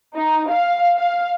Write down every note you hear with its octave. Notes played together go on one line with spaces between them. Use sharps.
D#4
F5
F5